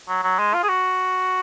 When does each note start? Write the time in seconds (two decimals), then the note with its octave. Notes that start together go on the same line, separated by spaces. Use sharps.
0.08 F#3
0.23 F#3
0.39 G#3
0.54 F4
0.63 G#4
0.69 F#4